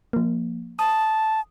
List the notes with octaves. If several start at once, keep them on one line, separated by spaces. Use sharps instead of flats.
F3 A#3
A5 D#6